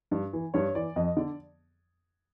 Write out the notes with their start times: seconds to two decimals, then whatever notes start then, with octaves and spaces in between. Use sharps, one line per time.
0.11 G2
0.33 E3
0.54 G2 C#5
0.75 E3 D5
0.96 F2 D#5
1.17 D3 D5